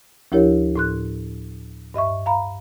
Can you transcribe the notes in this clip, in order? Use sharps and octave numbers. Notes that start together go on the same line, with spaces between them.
D2 F3 E4 G4 A#4 C#5
A2 C6 F#6
G2 D#5 E5 C#6
F5 A#5 B5